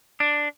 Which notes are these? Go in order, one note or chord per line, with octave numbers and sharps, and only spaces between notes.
D4